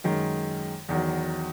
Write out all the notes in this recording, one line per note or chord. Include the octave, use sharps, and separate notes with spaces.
F#2 D#3 G#3
E2 D#3 F#3